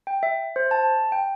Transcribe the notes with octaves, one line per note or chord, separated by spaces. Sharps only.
G5
E5
C5
A5
G5